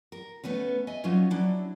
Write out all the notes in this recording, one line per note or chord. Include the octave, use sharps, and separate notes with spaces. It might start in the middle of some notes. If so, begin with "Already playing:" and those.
A#4
A3 B3 C#4 B4
D#5 E5 G#5
F#3 C#4 D#4 F4 C#5
F#3 D4 E4